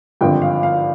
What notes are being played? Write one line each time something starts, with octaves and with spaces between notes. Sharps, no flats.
G#1 G2 D3 F3 C4 G5
F5
F5